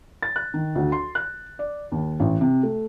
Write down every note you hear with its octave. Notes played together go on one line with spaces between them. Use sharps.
A6
F#6
D#3
D2
C6
F#6
D5
D#2
A1
C3
A3